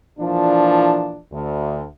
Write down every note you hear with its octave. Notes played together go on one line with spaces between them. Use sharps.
A#2 E3 F3 D4
D2